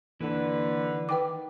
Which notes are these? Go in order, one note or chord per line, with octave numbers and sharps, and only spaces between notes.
D#2 D3 E3 B4
D#3 B4 G5 D6